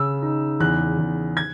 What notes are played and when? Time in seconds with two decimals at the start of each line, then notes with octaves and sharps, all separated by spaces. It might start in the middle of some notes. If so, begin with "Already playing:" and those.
Already playing: C#3 E6
0.22 D#4
0.60 E2 F#6
0.98 E2
1.37 G#6